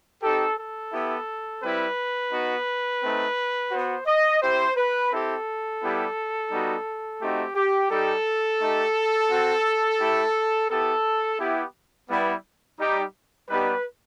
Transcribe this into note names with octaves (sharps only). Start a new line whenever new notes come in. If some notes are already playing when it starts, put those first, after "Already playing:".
C4 D#4 G4 A4
A4
B3 E4 G4
G3 C4 E4 B4
B3 D#4 F#4
A3 C4 D#4
B3 F#4 C5
D#5
C4 E4 G4 C5
B4
C4 E4 G4 A4
G3 B3 E4 G4
G3 B3 D#4 F#4
A3 C4 D#4 F#4 G4
G4
G3 D#4 G4 A4
A3 D#4 G4
C4 F#4
A3 E4 G4
B3 E4 G4 A4
B3 E4 G4
G3 B3 E4
G3 D#4 G4
G3 B3 D#4 G4 B4